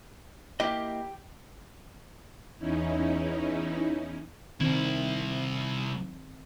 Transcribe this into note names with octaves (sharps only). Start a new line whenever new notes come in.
A#3 E4 G4 D#5
E2 C#4 D#4 E4
C2 D#3 C4 E4